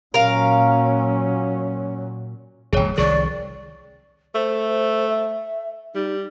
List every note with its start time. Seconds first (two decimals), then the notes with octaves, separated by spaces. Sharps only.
0.14 A#2 F#3 C#4 A#4 F5
2.73 D1 G#1 G#4 C#5 G5
2.98 C2 D#3 F3 G#4 D5 C#6
4.35 A3 C5
5.09 E5
5.95 G3 D#4